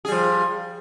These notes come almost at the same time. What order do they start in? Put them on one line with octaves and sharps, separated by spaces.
G#4 G3 F3